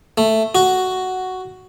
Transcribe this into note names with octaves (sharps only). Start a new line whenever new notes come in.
A3
F#4